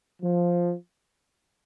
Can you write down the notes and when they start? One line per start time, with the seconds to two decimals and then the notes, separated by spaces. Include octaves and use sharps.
0.22 F3